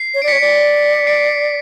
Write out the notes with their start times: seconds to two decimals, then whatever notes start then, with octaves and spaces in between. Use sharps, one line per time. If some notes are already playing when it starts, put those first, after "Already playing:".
Already playing: C7
0.14 C#5
0.22 D5 D7
0.28 C#5 B6 C#7
0.41 D5
1.07 C7 D7